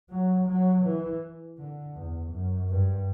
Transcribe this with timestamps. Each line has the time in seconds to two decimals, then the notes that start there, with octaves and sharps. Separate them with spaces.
0.10 F#3
0.47 F#3
0.84 E3
1.58 D3
1.95 E2
2.31 F#2
2.69 G2